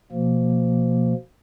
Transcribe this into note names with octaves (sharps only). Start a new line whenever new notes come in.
B2 F3 A#3